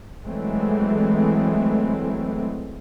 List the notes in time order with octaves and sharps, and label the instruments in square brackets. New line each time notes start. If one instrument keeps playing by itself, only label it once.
[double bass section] E3 F#3 G#3 A3 C4